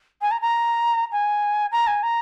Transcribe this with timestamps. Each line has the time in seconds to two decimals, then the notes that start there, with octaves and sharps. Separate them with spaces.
0.21 G#5
0.31 A#5
0.41 A#5
1.12 G#5
1.72 A#5
1.87 G#5
2.03 A#5